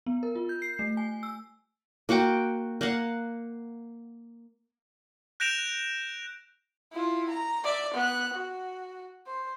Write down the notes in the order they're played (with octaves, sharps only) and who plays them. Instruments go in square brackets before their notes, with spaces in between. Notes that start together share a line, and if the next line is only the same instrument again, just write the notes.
[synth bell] B3
A#4
F4
G6
C7
A3
G#5
E6
[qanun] A#3 F#4 F#5 G5
A#3 F5 F#5
[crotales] F#6 G6 A#6 D7 E7 F7
[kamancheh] E4 F4
A#5
D5 E5
B3 F#6
F#4
C5